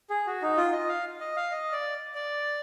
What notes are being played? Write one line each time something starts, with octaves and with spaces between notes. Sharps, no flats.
G#4
F#4
D#4
F4
D#5
F5
D#5
F5
D#5
D5
D5